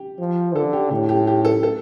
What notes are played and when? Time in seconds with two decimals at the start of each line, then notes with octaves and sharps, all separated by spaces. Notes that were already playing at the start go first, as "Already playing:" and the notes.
Already playing: G4
0.19 F3
0.55 D3 A4
0.73 G4
0.91 A2 G4
1.09 G4
1.27 G4
1.45 A4
1.63 A4